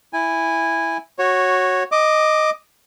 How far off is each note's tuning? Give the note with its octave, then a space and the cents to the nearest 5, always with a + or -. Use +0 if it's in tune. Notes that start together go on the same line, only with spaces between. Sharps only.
E4 +0 G#5 -15
F#4 +0 C#5 -10
D#5 +0 D6 +15